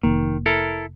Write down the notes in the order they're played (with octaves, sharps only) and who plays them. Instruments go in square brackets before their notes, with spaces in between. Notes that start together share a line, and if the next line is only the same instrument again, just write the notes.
[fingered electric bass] F1 A#3 [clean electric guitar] D#3
[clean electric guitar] E4 A4 A#4